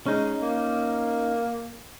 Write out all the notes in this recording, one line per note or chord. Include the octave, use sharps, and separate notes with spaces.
G#3 C#4 D#4
A#3